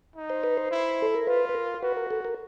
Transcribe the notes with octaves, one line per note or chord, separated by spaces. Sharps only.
D#4
C5
B4
C5
E4
A4
A#4
F4 B4
B4
A#4
F#4 B4
A#4
A4
A#4